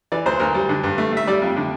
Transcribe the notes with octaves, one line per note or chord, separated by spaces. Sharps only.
E3 D5
D2 C5
D2 A#4
G3
D3
G2
A3
A3 E5
G3 D5
F2
D3